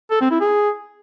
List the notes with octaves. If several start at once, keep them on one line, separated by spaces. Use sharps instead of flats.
A4
C4
E4
G#4